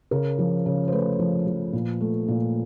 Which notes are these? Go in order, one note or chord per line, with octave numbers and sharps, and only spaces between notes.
C#3 A#4
F3
C#3
C5
A3 B4
F3
F3
A#2
A3
A#2